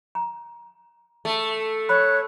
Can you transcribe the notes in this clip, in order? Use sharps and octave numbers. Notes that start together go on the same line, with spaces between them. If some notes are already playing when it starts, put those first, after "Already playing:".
A#5
A3
C#5 B5 F#6